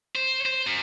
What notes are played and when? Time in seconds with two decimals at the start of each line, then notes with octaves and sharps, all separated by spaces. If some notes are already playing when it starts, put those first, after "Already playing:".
0.15 C5
0.46 C5
0.67 F#2